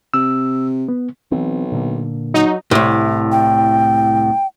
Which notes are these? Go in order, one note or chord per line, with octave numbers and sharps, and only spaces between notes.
C3 E6
B3
B1 E3 C4
A#2 D3 A#3
F#3 D#4
C2 A2
G5